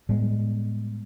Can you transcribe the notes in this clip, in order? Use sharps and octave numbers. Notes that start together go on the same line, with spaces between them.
A2 G3 G#3 B3